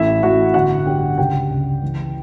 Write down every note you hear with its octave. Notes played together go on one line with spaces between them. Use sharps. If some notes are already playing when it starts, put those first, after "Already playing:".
Already playing: A1 A3 E4 E5
A1 F#4 F#5
G1 F#4 F#5
G2 G4 G5
C#2 G4 G5
C#2
E3